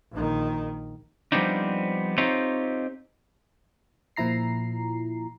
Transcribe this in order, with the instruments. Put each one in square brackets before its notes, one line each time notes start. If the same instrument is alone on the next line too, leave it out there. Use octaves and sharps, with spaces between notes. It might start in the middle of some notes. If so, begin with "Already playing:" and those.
[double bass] A#1 D#3
[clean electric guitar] F3 G3 B3 C4 D4 D#4
C4 D#4 F4 G4 C#5
[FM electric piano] A#2 F3 E4 A#5 C7